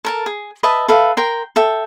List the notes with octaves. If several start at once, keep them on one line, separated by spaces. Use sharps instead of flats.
A4 A#4 A5
G#4
B4 D#5 E5 A5
A4 B4 E5 F5
A#4 G5 C6
A4 E5 G5